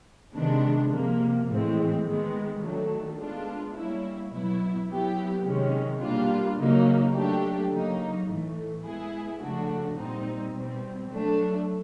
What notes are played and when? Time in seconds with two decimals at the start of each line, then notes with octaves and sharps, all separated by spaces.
0.35 C3 D#3 G#3 B3 D4
0.91 C3 F3 A#3
1.48 A2 E3 G#3 C4
2.04 D#3 G#3 B3
2.61 D#3 F#3 A3 D4
3.18 G#3 B3 D4 F4
3.74 G3 A#3 C#4 E4
4.31 B2 F#3 B3 E4
4.87 F#3 B3 E4 G4
5.44 C3 D#3 G#3 C#4
6.01 B2 G3 A#3 D4 F4
6.57 C#3 F#3 A#3 D#4
7.14 F#3 A3 D4 G4
7.70 C#3 F#3 A#3 D#4
8.26 A2 E3 A3
8.83 G#3 B3 E4 G#4
9.40 C#3 F3 A3 D4 F#4
9.97 A#2 G3 C4 D#4
10.53 B2 G3 C4
11.10 F#3 A3 D4